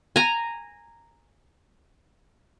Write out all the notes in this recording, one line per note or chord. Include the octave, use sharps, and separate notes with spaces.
G#5 A#5